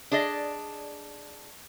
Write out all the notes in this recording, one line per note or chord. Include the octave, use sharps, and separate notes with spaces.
D4 G#4 D5 D#5